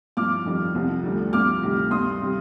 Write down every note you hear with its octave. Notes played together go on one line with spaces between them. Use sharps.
G2 F3 D6 F6
F2 D#3 G3
C2 C3 F3
D2 D3 G3
G2 F3 D6 F6
D2 C3 D#3 G3
G2 D#3 G3 C6 D#6
C3 G3